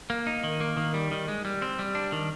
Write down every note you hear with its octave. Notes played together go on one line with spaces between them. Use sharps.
A#3
D#4
D#3
A#3
D#3
G3
D#3
G#3
G3
C4
G3
D4
D#3